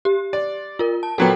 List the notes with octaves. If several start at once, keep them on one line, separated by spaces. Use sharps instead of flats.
G4
D5
F4 A#4
A5
A#2 F#3 B3 A4 G5